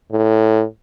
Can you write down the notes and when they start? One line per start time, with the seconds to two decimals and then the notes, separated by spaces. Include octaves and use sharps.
0.11 A2